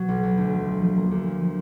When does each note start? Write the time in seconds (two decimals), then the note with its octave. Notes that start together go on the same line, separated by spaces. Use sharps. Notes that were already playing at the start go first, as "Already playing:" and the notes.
Already playing: B2 F#3
0.09 B1
0.23 B1
0.38 D2
0.53 F3
0.68 F3
0.82 F3
0.96 A#3
1.11 D2
1.26 F3
1.41 F3